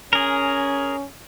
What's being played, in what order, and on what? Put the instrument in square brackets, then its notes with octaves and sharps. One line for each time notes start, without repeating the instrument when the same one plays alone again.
[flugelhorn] C#4 [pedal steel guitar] G#4 A#4